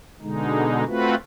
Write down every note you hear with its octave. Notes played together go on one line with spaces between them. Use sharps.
B2 D3 G#3 D#4
A3 C4 F4 F#4 B4